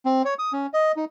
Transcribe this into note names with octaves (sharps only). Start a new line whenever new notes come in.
C4
C#5
D#6
C#4
D#5
D#4